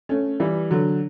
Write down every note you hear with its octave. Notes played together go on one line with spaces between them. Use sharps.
A3 C#4
E3 G3
D3 F#3